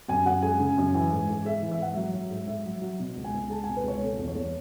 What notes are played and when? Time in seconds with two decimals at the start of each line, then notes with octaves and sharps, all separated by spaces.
0.08 F#2 G#5
0.26 F#2 F#5
0.42 G#3 G#5
0.60 C#3
0.78 F#2
0.94 E3 G#5
1.11 G#2
1.29 G#2
1.45 G#3 E5
1.62 E3
1.71 E5
1.79 G#2 F#5
1.94 F#3 E5
2.14 F#3
2.30 G#2
2.47 G#2 E5
2.65 F#3
2.81 F#3
2.99 B2
3.16 C#2
3.24 G#5
3.34 C#2
3.50 G#3 A5
3.64 B2 G#5
3.76 B4
3.84 C#2 C#5
4.01 B2 A4
4.18 E2
4.28 C#5
4.35 E2